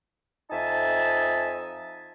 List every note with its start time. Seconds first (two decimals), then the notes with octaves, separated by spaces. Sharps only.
0.51 F2 D#4 E5 G#5 A5